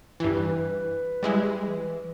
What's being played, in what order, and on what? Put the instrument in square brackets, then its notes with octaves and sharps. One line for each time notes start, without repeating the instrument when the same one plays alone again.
[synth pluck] G2 E3 [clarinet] B4
[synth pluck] G3 G#3 E4
[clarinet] E3